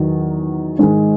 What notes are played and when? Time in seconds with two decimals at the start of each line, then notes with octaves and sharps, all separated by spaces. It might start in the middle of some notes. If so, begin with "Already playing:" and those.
Already playing: E2 D#3 F#3
0.79 G#2 D#3 G#3